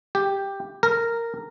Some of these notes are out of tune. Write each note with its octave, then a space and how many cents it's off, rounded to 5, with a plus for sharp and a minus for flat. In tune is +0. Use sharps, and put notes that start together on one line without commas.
G4 +5
A#4 -10